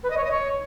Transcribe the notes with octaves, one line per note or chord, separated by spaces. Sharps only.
B4
D#5
C#5
D#5
C#5